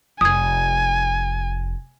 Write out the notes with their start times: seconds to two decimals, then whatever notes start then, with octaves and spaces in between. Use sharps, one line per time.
0.21 F1 G#5 D#6 G#6